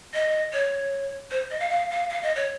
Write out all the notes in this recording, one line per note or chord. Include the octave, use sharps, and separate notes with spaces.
D#5
C#5
C5
D#5
F5
F5
F5
F5
D#5
C#5